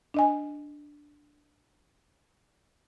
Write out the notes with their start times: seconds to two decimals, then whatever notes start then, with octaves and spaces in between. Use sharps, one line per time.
0.14 D4 D#5 G#5